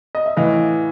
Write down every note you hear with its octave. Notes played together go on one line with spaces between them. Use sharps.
D#5
E5
A2 E3 D#5 F5